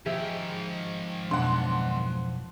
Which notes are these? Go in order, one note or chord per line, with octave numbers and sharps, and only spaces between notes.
G#2 D#3 F3 G4 G#4 E5
B1 F2 D4 F#5 C6